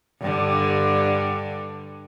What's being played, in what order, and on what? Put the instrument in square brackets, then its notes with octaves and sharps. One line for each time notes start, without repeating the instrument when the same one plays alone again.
[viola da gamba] G2 D3